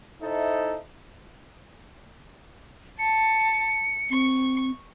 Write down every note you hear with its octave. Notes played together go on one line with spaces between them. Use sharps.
D#4 E4 A4 C5 D#5 E5
A5 C#7
C4 C#6